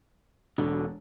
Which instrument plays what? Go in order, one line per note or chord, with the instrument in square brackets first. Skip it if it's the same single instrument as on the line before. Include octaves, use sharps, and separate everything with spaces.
[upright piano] E1 [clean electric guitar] B2 D3